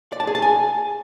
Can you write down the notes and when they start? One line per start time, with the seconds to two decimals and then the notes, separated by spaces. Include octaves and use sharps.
0.12 D5
0.20 A5
0.27 G#4
0.35 A5
0.42 G#5